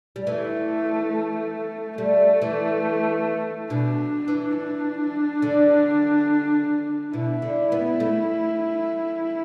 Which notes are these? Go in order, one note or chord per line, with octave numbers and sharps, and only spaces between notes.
G3
E3 A3
G3 A3
E3
B2 D4
E3
D4
D3
B2 E4
D3
B3
A3